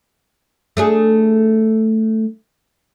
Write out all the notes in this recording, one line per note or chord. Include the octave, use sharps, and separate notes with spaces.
A3 D4 G#4